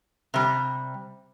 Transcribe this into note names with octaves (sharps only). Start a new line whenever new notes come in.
C3 G3